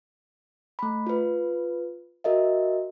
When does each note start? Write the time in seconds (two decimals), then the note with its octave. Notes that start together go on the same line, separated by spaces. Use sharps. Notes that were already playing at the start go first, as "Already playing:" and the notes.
0.79 A3 B5
1.06 F4 B4
2.24 F#4 A#4 D#5 E5